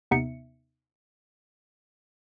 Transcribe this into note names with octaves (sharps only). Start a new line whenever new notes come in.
D#2 C3 B3 D#4 E5 C#7